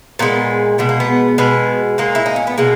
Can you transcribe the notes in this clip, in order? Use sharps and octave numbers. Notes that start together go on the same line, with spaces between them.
A#2 G#3 B3
B2 G#3 B3
A#3
B3
B2 G#3 B3
A#2 G#3 A#3
E4
D#4
C#4
B3
B2 G#3 A#3